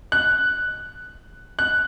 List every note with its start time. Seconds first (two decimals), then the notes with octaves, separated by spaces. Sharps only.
0.12 F#6
1.59 F#6